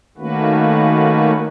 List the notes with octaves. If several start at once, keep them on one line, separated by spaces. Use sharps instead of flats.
D#3 A3 A#3 C#4 F#4 B4